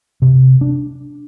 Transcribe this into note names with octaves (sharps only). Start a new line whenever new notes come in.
C3
D4